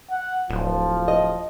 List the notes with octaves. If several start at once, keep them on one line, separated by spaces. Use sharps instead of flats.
F#5
D1 F3
D#5